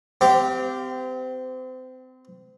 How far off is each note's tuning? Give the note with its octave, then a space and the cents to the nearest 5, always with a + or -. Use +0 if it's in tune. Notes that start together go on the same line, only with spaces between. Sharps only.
C4 -30 G4 +0 F5 +0